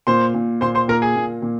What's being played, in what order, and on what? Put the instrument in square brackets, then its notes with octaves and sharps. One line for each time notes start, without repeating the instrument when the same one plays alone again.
[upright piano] A#2 [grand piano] C5 C6
[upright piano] A#2
[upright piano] A#2 [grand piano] C5 C6
[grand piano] C5 C6
[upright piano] A#2 [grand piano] A#4 A#5
[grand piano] G#4 G#5
[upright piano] A#2
A#2